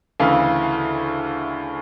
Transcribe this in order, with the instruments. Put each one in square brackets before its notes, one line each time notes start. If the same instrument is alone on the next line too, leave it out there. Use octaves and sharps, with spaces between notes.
[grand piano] D2 C#3 E3 F5